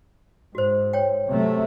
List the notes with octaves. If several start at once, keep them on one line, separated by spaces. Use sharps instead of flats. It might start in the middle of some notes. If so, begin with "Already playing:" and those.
G#2 F#4 C5
C#5 G5
C3 F#3 A3